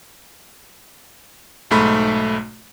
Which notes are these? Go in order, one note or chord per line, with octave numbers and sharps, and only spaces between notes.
B1 G#2 A3 B5